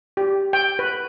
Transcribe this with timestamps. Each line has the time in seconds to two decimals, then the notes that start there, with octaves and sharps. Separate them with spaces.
0.17 G4
0.53 G5
0.79 B4